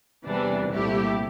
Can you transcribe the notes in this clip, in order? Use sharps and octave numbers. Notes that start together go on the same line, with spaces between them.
E2 C3 E3 G3 D4
C2 A#2 A3 E4 G4